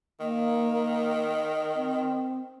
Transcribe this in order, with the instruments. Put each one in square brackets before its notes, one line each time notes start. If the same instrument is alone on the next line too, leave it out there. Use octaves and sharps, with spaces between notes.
[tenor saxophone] D#3 [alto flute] A#3
[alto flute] C4